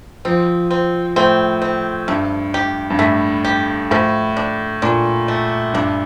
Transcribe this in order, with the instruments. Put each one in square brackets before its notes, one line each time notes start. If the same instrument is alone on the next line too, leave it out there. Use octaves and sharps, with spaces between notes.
[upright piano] F3 [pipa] C4
[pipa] C4
[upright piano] A2 [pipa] C4
[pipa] C4
[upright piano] G2 [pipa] A3
[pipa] G4
[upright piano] G2
[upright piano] A2 [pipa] A3
[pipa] G4
[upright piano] A2 [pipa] F3
[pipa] D4
[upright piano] A#2 [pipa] D4
[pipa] A3
[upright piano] G2 [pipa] D4